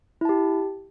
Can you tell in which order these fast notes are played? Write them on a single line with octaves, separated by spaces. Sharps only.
E4 A5 G4